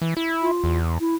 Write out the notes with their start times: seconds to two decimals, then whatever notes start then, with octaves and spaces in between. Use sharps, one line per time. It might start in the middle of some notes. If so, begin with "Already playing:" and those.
0.02 E3
0.17 E4
0.42 F4
0.64 E2
1.00 E4